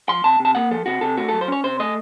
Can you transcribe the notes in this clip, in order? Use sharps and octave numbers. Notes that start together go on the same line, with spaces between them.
F3 C6
C3 A5
C3
A5
A#3 F#5
F3 A4
C3 F#4
C3 A4
A3 F#4
F#3 A4
C5
C#4 C#5
C3 C5
A3 D#5